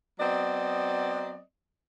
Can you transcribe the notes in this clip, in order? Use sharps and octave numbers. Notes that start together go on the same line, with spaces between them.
F#3 B3 C4 D5 D#5